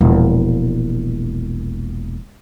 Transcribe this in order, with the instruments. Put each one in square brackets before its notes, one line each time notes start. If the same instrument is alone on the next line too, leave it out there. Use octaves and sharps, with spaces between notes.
[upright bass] E1 A#1